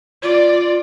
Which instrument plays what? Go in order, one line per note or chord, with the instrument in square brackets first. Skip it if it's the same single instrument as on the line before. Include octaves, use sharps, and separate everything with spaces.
[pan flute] F4 [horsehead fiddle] D5